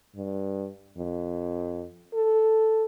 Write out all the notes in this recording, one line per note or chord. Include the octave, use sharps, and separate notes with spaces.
G2
F2
A4